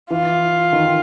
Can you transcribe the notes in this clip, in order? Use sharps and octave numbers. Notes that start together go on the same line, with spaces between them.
E3 F4
D#3